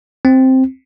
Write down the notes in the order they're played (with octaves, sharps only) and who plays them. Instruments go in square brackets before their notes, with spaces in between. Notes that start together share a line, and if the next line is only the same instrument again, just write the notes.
[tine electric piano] C4